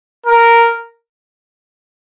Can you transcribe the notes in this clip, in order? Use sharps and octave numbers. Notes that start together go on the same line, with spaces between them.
A#4